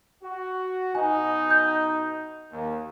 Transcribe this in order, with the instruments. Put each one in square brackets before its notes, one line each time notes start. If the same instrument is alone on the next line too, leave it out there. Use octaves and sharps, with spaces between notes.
[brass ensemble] F#4
[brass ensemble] B2 D#4 [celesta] G#5
[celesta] G6
[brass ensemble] D#2